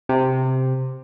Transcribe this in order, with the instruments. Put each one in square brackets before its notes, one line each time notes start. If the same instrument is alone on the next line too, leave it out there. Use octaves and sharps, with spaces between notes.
[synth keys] C3